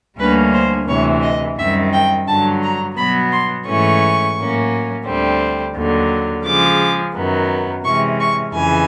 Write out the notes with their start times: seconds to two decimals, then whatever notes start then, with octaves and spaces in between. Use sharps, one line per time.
0.19 D2 D3 G3 A#3 C#4 B4
0.53 C5
0.88 D2 C3 E3 C#5
1.22 D#5
1.58 F#2 D#3 G3 C4 E5
1.92 G5
2.27 G2 D3 F#3 A5
2.63 A#5
2.97 B2 F#3 B3 B5
3.31 C6
3.66 G#2 E3 A3 C#4 C#6
4.36 A2 F#3 A#3 C#4
5.06 D2 D3 G3 C4
5.75 D#2 D3 F#3
6.45 C#3 F3 G#3 D6
7.15 F#2 D#3 F#3 B3
7.84 C3 E3 G#3 C#4 C#6
8.20 C#6
8.54 F2 C#3 E3 G#5